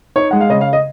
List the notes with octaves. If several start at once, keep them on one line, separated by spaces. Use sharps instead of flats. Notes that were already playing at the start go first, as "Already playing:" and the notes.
D#4 C#5
G#3 F#5
F5
C#3 D#5
F5
D#5